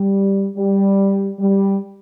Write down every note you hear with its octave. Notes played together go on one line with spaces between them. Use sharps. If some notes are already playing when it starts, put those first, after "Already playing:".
Already playing: G3
G3
G3